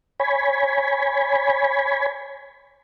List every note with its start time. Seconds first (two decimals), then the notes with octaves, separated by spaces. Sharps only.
0.20 C#5 G#5 B5